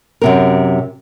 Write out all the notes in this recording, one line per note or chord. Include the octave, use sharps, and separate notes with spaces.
F#2 C3 A#4